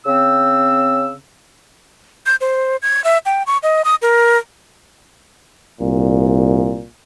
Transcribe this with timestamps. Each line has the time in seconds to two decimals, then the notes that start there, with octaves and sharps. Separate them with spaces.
0.06 C#3 C4 E6
2.26 G6
2.41 C5
2.82 G#6
3.04 E5
3.26 G5
3.47 C#6
3.63 D#5
3.85 D#6
4.02 A#4
5.81 C2 A#2